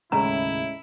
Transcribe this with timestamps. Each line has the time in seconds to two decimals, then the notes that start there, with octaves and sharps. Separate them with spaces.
0.12 D#2 A2 C#3 G#3 C#4 E4 A#5